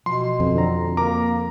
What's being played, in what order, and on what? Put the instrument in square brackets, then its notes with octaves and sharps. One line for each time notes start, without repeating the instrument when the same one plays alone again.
[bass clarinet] B2 [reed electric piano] F3 [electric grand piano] C6
[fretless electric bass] F2 [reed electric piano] F3
[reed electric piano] D3 C4 A#5
[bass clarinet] A#3 [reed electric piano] A#4 D6 [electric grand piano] A#5